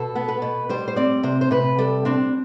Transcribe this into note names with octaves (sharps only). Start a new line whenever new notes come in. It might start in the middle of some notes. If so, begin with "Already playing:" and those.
Already playing: B2 A4
B3
B4
B2
G3 C5
C5
C4 D5
C3 C5
C5
C3 B4
G3 A4
C4 D4